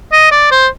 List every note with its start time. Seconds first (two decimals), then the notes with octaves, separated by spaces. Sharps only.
0.13 D#5
0.32 D5
0.52 C5